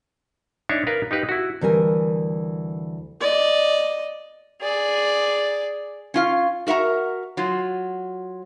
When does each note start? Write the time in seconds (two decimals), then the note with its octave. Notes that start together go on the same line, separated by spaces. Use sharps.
0.69 D4 D#4 C#5 E5
0.87 A#4 B4 F5
1.11 D#4 G4 B4 F5
1.29 E4 F#4
1.61 D2 E3 G3 A#4 G#5
3.21 D5 D#5
4.62 G#4 D5
6.14 C#4 F4 F5
6.67 F#4 A#4 E5 F#5 A#5
7.37 F#3 F4